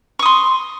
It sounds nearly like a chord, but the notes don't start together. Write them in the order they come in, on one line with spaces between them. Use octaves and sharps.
C#6 D#6 C6